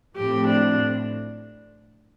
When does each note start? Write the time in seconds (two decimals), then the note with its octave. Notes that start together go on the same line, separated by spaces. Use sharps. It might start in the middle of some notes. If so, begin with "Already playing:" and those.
0.17 A2 F3 C4 G4
0.48 D4